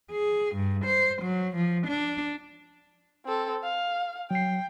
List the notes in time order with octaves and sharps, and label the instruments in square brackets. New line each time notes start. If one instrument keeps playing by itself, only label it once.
[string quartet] G#4
G2
C5
F#3
F3
D4
[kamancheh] C4 A4
F5
[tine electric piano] F#3 C7 [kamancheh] G5